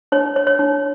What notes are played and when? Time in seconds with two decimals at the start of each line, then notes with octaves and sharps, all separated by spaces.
0.12 D4 C#5
0.36 C#5
0.47 C#5
0.59 D4